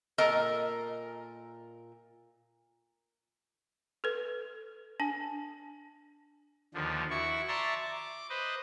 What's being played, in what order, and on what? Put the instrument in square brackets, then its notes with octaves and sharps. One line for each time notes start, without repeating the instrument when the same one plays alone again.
[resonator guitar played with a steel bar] A#2 A4 A#4 D#5 A#5
[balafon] A4 B4
D4 G#5
[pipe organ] D#2 D3 F3
E4 F#4 C#6
D5 E5 A5 A#5 C6 C#6
D6
B4 C5 D#5